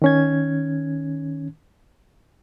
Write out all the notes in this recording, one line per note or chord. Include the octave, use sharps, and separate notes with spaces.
D#3 C#4 G#6